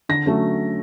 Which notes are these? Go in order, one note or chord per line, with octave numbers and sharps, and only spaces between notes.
D3 A#6
F#3 A3 C#4